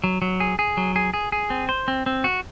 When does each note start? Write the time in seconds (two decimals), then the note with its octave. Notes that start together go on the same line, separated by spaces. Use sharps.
0.04 F#3
0.22 F#3
0.40 G#4
0.59 G#4
0.77 F#3
0.96 G#4
1.14 G#4
1.32 G#4
1.50 C4
1.69 C5
1.88 C4
2.06 C4
2.24 F#4